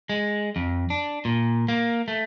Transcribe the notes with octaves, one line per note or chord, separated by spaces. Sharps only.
G#3
F2
D4
A#2
A#3
A3